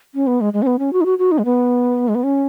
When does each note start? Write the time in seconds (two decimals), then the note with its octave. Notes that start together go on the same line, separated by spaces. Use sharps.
0.15 C#4
0.27 B3
0.41 G#3
0.53 G#3
0.62 C#4
0.67 B3
0.79 C#4
0.93 F#4
1.01 D#4
1.06 F#4
1.19 F#4
1.32 D#4
1.38 G#3
1.45 B3
2.08 G#3
2.15 B3
2.24 C#4